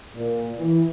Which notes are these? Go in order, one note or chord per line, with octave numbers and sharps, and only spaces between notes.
A#2
E3